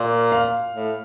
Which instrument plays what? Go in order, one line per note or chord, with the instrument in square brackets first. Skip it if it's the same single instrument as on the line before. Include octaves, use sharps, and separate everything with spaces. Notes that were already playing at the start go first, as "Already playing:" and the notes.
Already playing: [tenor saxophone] A#2 [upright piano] A#4
[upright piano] F5
[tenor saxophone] A2